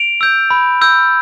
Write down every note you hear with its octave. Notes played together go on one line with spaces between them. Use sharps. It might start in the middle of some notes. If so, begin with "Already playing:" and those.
Already playing: D7 F7
E6 G6
B5
E6 G6